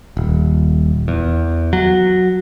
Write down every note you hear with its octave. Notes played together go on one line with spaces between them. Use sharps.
D#1
E2
F#3